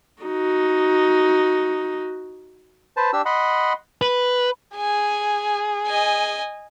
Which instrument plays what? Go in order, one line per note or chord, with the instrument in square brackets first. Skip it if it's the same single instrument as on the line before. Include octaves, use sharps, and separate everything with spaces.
[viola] D#4 F#4
[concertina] B4 C5 A5
D4 G4 E6
D#5 F#5 B5 C6
[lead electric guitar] B4
[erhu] G#4 [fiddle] G#5
[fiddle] D#5 G#5